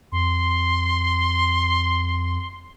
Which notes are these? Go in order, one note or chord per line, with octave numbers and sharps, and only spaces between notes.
F2 C6